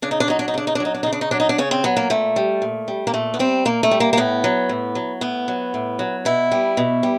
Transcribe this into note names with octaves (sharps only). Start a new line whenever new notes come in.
C#3 D4
D#4
D4
F#3 D#4
D4
D#4
C#3 D4
D#4
D4
F#3 D#4
D4
C#3 D#4
D4
D#4
F#3 D4
D#4
D4
C#3 C#4
C4
F#3 B3
A#3
A#2 A3
G3
A#2
G3
A#3
A#2 A3
B3
G3 C4
A#2 A#3
A3
G3
A#3
A#3
A2 B3
F#3
A2
F#3
A2 B3
F#3
A2
F#3
B2 E4
G3
B2
G3